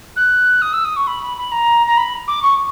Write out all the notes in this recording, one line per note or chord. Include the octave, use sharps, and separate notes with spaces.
F#6
D#6
E6
D#6
C#6
B5
B5
B5
A#5
A#5
B5
D6
C#6